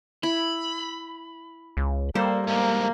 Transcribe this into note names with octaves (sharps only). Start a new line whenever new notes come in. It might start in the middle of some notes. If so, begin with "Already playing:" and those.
E4 B5
C#2
G3 A#3 A4 C5
D2 G#2 A#3